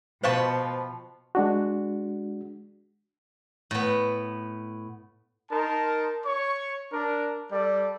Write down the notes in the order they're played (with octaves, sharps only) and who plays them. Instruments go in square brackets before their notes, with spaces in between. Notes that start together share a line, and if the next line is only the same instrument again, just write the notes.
[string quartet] B2 F3 [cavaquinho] B4 G5 A5 [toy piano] C5 F5 C#6
[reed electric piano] G#3 D4 F#4
[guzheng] A2 B3
[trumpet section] D#4 A#4 A5 C6
C#5 C#6
D4 A#4
G3 A4 D5